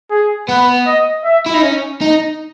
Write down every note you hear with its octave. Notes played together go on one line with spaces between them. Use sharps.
G#4
B3 B4
D#5
E5
E4
D#4
C#4
D#4